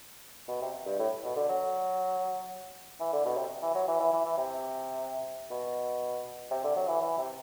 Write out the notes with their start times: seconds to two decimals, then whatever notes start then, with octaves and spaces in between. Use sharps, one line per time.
0.48 B2
0.62 C3
0.86 G2
0.99 A2
1.24 B2
1.36 D3
1.49 F#3
3.00 E3
3.13 D3
3.25 B2
3.37 C3
3.62 E3
3.75 F#3
3.88 E3
4.00 E3
4.13 E3
4.26 E3
4.37 C3
5.51 B2
6.51 C3
6.64 D3
6.76 F#3
6.88 E3
7.01 E3
7.18 C3